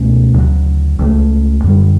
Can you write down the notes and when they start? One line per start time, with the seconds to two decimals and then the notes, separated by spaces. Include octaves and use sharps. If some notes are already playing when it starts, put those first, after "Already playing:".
Already playing: C#2 B2 A3 C#4
0.34 D2 C#3 F#3
0.99 C#2 C#3 E3 A3
1.64 F#2 D3 G3